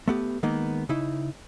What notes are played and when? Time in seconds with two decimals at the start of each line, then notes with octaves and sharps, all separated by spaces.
0.08 A3 B3 G4
0.43 D#3 G#3 A#3 B3 D#4
0.89 C#3 D#4 E4